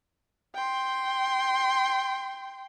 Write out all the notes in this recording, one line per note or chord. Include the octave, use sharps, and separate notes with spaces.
G5 C6